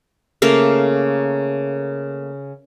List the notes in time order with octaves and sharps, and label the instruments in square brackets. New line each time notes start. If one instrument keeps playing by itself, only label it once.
[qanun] C#3 A3 A#3 F5